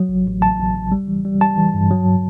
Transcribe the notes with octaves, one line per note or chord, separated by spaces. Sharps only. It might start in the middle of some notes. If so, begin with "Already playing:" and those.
Already playing: F#3
A1
A1
A1 A5
A1
A1
G3
E3
G3
G3 A5
E3
G2
F#3